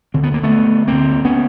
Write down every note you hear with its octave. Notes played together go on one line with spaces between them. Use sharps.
D2 D3 C4
B3
A#3
A3 B3
D2 D3 A#3 C4
B3 C#4